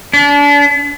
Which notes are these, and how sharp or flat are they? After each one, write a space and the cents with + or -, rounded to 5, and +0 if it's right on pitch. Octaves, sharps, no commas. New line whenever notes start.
D4 -35